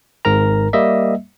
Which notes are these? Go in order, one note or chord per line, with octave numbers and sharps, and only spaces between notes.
G#1 G#2 A#4 A#5
G3 A#3 D#5 E5